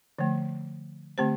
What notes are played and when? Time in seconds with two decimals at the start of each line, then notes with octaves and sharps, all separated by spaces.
0.19 D3 F3 A3
1.18 D3 A3 C4 G4 C5